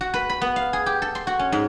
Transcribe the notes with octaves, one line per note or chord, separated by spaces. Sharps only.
F#4
B4
B5
B3
F5
G#4
G4
A4
C6
F#4
C#4
G#2